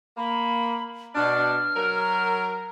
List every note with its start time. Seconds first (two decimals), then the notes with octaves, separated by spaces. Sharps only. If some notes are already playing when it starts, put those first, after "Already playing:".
0.17 A#3 B5
1.15 B2 D4 F6
1.75 F#3 A#4